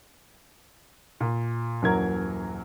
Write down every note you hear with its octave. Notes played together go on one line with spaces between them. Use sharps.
A#2
D#1 F#2 E3 F#3 A#4 G#6